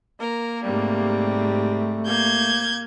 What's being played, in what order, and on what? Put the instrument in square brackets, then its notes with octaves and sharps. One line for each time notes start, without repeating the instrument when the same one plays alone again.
[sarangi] A#3 [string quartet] A#4
[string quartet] G#2 C3 G3 [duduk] A3
[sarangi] A#3 [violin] G6 G#6